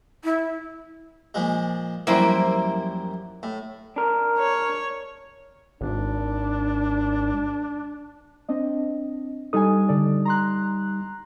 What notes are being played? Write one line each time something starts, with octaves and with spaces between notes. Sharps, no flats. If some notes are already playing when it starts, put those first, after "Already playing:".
E4
A#2 F3 G#3
F#2 F3 G3 A#3 E4 C5
A2
D4 A#4
C#5
G#1 D4
C4 D4 D#5
G3 D#4 A4 G#5 D#6
D3 A4 D5
A#5 C6 F#6